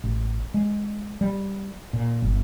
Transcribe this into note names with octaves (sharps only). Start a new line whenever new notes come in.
A1
G#3
G3
A#2
G1